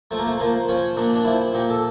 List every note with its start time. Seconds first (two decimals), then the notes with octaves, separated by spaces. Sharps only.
0.11 F3 A3
0.18 A#3
0.26 A3
0.40 F3 A#3
0.69 F3 C#4
0.96 A#2 D4
1.15 D4
1.25 F3 E4
1.53 A#2 G4
1.70 A4